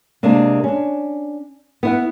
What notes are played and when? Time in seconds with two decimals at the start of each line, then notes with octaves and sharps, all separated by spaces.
0.23 C3 G#3 A#3 D4
0.64 C#4 D4
1.83 B3 E4 F#5